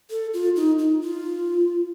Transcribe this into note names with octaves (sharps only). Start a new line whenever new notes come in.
A4
F4
D#4
D#4
F4